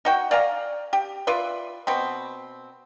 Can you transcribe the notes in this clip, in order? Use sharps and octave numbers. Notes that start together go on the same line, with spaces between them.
D#4 F#4 G5
D5 F5 G#5 A#5
G4
F4 B4 D5 E5
B2 C4 B5